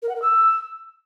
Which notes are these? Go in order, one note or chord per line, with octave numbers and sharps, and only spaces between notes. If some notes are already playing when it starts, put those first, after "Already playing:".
A#4
F#5
A#4
E6